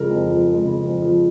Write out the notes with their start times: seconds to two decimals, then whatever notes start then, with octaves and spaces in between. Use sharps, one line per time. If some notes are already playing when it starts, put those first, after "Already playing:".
Already playing: F2 C#3 F3 G#3 A#4
0.11 F2
0.29 F3
0.47 G#3
0.66 C#3
0.84 F2
1.02 F3